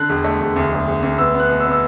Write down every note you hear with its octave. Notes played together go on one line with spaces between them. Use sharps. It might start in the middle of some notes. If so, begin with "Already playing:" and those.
Already playing: D3 F#6
E1
A3
E1
D2
E1
E1
D2
B3 E6
B3
F#6
B2
E6
B3
E6